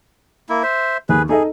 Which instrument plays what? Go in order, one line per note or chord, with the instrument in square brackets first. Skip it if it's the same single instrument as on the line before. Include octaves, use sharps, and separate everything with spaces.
[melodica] A#3 E4
C5 E5
[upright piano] D#2 [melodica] G#4 B4
[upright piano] D#4 A4 D#5 [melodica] G#4